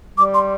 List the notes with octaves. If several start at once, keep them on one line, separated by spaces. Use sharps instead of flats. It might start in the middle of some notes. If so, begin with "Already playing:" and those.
G3 D6
C6